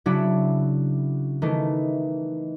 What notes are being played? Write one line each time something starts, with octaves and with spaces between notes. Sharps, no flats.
C#3 F#3 C#4 D4 E4 F#4
D#3 E3 A3